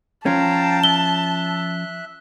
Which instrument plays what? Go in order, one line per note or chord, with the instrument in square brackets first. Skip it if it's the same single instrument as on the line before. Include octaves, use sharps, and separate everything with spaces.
[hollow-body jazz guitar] F3 C#4 [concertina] F5 G5 A#5 [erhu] A5
[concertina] E5 F#6 [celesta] G7